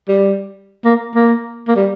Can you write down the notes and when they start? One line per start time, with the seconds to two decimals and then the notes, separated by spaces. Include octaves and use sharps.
0.08 G3
0.85 A#3
1.15 A#3
1.68 A#3
1.76 G3